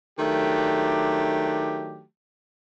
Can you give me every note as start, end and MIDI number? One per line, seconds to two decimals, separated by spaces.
0.19 2.03 51
0.19 2.03 54
0.19 2.03 57
0.19 2.03 62
0.19 2.03 67